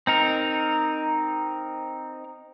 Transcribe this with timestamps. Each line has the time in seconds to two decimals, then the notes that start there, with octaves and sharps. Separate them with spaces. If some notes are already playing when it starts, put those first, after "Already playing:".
0.07 C4 D#4 A#4